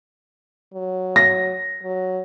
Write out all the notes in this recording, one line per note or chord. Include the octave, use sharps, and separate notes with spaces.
F#3
A#6
F#3